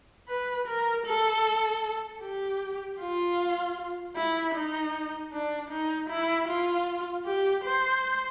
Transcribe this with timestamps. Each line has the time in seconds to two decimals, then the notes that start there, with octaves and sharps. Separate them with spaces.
0.28 B4
0.67 A#4
1.06 A4
2.22 G4
3.00 F4
4.16 E4
4.55 D#4
5.32 D4
5.71 D#4
6.09 E4
6.48 F4
7.26 G4
7.64 C5